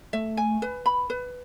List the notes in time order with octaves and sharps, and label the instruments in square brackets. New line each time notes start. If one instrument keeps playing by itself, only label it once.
[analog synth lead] A3 [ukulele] E5
[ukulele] G#5
B4
B5
B4